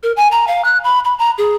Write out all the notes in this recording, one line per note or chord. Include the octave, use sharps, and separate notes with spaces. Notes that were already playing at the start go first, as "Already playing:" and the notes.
A#4
G#5
A#5
F5
F#6
B5
B5
A#5
G#4